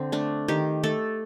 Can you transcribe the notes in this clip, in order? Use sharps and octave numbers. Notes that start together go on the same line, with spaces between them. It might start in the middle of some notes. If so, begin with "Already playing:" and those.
Already playing: D3 C4
A3 D4
D#3 G4
A3 A4